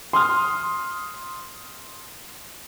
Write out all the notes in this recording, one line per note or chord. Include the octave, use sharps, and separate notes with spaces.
C6 D#6 F6